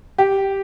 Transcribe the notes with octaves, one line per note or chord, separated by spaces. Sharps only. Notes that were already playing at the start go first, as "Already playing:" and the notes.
G4